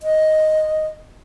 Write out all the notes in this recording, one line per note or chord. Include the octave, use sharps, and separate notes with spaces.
D#5